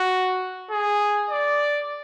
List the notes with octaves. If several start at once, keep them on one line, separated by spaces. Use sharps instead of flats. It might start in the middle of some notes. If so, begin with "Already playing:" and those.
Already playing: F#4
G#4
D5